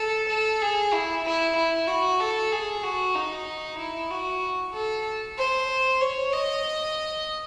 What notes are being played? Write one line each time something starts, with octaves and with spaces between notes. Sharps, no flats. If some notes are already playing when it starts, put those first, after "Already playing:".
Already playing: A4
A4
G#4
E4
E4
E4
F#4
A4
G#4
F#4
D#4
E4
F#4
A4
C5
C#5
D#5